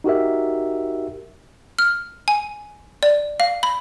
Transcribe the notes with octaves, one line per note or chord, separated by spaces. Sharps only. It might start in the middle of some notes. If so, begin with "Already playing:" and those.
D#4 F#4 G4 A#4 E5
F6
G#5
D5
F5
B5